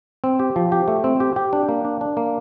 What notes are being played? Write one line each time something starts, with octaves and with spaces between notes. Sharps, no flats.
C4
G4
F3
G4
A3
C4
G4
G4
D4
A#3
D4
D4
A#3